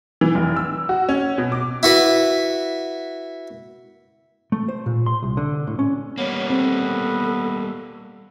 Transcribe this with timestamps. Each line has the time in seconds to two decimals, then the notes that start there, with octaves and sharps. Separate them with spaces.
0.21 E3
0.35 F1
0.56 E6
0.89 F#4
1.09 C#4
1.38 B2
1.52 D6
1.83 E4 F#4 B4
4.52 A3
4.69 C5
4.86 A#2
5.06 C6
5.22 C2
5.37 D3
5.67 A2
5.79 C#4
6.18 G3 A#3 B3 C#5
6.50 C4 A4